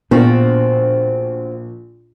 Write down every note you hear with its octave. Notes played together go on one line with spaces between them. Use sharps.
A#1 A2 F3 B3 C4 D4 F#4